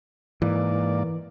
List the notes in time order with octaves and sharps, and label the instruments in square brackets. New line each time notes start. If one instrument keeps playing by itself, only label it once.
[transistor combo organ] G#2 A#3 D5 [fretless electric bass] E3